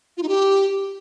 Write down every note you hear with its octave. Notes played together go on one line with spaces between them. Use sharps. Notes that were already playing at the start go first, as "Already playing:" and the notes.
F4
D#4
G4